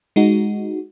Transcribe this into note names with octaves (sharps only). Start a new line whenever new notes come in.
G#3 D#4 F#4